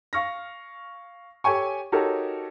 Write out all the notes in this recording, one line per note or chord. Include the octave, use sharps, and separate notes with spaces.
F5 C#6 F6 A#6
G4 A4 C#5 G5 G#5 C#6
D#4 F#4 G4 A4 A#4 C#5